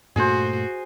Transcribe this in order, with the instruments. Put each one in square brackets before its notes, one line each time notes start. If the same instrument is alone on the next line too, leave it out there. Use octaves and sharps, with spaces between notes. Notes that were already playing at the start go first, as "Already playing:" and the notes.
[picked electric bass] G2 A#2 A3 [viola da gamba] F#4 [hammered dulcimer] G#4 C5